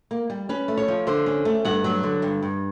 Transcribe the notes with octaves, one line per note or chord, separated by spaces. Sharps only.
A#3
G3
C#4 B4
A3
C#5
F3
D3 C5
C#4
A3
G2 F#5
F#3
D3
G2
G2